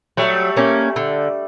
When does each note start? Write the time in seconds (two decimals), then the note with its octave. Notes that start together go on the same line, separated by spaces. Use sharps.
0.17 F#3 G3 A3
0.57 A#3 C#4
0.96 D3